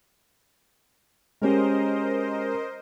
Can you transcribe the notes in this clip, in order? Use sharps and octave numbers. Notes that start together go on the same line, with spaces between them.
G#3 C#4 G4 A#4 C5 D#5